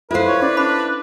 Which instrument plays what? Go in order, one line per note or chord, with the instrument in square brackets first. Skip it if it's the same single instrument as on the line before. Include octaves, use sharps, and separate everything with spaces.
[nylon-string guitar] E4 C5 [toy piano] F4 A4 F5 [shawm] B4
[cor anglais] C#5
[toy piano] C#4 [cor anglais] D5
[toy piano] C#4 B5 [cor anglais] D4